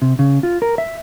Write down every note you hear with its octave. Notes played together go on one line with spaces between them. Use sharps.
C3
C#3
F4
A#4
E5